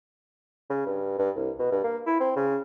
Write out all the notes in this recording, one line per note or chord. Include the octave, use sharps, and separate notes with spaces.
C#3
G2
G2
C2
B2
G2
A#3
E4
C4
C#3